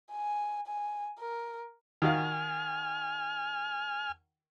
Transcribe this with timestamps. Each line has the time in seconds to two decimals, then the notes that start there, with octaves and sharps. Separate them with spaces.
0.12 G#5
0.67 G#5
1.19 A#4
2.02 D#3 F#4 F5 G#5 F6